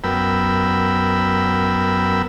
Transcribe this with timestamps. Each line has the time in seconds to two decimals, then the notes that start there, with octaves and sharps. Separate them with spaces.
0.04 F#2 B3 A#4 G5 B5 E6